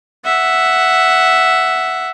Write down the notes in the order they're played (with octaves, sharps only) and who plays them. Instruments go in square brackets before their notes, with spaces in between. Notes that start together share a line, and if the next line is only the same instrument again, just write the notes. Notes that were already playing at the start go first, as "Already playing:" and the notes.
[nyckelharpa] E5 F#5